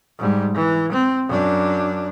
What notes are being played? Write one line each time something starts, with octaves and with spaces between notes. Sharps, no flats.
G#2 G3
E3
C4
F#2 D4